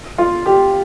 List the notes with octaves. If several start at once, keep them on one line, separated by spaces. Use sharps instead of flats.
F4
G4